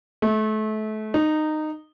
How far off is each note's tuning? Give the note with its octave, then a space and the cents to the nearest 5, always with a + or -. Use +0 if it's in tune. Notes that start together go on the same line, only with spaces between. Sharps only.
A3 -30
D#4 -15